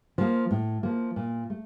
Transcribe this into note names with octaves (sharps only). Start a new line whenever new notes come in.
F3 A#3
A2
F3 A#3
A#2
A3